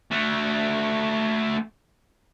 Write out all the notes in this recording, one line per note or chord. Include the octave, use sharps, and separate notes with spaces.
A3 F#4